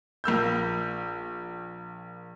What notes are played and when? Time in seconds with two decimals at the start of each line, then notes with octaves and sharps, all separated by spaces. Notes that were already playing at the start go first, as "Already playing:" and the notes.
0.24 A#1 A#3 E6 G6